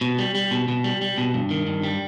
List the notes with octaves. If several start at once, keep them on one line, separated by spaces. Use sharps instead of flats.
B2
G3
G3
B2
B2
G3
G3
B2
G2
D#3
G2
G3